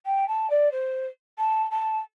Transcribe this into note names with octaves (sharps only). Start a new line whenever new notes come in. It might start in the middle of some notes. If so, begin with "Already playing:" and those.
G5
A5
D5
C5
A5
A5